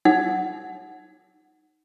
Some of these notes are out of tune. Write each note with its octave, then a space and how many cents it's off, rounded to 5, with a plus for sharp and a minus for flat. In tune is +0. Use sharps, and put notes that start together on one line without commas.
D#4 +0 F#5 +0